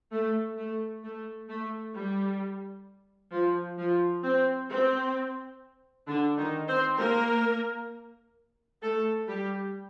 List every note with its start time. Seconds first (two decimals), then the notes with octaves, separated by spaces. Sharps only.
0.12 A3
0.58 A3
1.03 A3
1.49 A3
1.95 G3
3.32 F3
3.78 F3
4.23 C4
4.70 C4
6.07 D3 D4
6.38 D#3 D#4
6.68 C4 C5
6.98 A#3 A#4
8.82 A3 A4
9.28 G3 G4